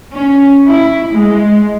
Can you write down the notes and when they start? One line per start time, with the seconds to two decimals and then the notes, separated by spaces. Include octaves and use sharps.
0.14 C#4
0.66 E4
1.13 G#3